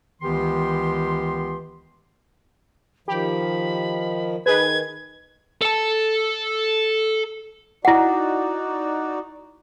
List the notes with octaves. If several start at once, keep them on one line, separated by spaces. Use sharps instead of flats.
C#2 D#3 E3 B3 G4 C6
D#3 F3 G4 B5
D#3 D#4 G#4 B4 G#6
A4 A5
D#4 E4 F#4 D5 F#5